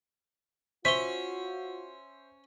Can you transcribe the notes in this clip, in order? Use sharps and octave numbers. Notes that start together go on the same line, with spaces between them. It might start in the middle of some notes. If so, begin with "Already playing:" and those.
C#4 F4 F#4 C5 E5 B6 G7